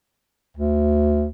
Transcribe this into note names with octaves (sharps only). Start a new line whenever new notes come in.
D2